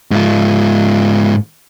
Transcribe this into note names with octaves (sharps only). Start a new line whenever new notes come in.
G#2 F4